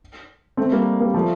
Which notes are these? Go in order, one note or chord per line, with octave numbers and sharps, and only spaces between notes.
A3 C4
G3 A#3
G3 A#3
F3 A3